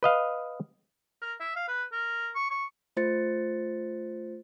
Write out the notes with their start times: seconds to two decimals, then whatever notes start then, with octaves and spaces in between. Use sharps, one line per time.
0.03 B4 D#5 F5
1.21 A#4
1.40 E5
1.56 F5
1.68 B4
1.92 A#4
2.35 C#6
2.50 C#6
2.97 A3 F4 C5 A6 C#7